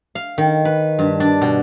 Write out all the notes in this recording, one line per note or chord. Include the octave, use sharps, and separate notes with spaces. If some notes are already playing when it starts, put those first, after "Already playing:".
F5
D#3
B4
G2
D4
B2